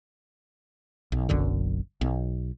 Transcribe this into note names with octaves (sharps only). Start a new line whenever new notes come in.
B1
F#1 B1 F#2 D3
B1